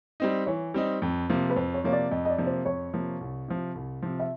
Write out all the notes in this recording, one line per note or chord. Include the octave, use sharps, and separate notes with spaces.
G3 C4 D#4
E3 C#5
G3 C4 D#4
F2
C3 F3 A#3
B4
F2 C5
C#5
C3 F3 A#3 C#5
D5
F2 D#5
D#5
D5
C3 F3 A#3
C5
F2 C#5
C3 F3 A#3
C2
C3 F3
C2
C3 F3
E5